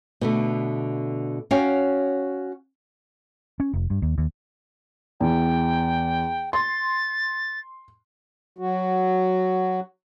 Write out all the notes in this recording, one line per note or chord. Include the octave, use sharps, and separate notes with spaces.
B2 D3 A3
C#4 F#4 C#5 F5 G5
C#4
F1
G2
D#2
D#2
E2 G5
C6 A6
F#3 F#4